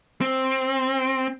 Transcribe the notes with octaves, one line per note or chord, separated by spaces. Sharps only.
C4